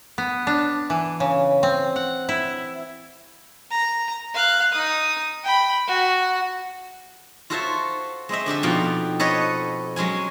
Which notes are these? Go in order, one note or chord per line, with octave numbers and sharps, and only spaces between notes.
B3
D4
E3
C#3
C4
F#5
E4
A#5
F5 F#6
D#4 D#6
G5 B5
F#4
F4 F#4 A4 C5 C#5 E5
G#3 C4 D#5 E5
D3 D4 G4 E5
F2 B2 F3 D#4 F5 G5
A4 B4 C#5 D#5
F#3 G#3 C#4 G#5